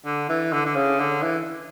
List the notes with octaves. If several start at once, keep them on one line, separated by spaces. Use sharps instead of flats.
D3
E3
D3
D3
C#3
D3
E3